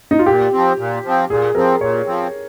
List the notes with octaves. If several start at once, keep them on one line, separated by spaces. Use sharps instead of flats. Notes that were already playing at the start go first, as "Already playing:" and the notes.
D#4
F4
A#2 G4
F3 C4
A#2
F3 C4
A#2 G#4
F3 C4 A#4
A#2 C#5
F3 C4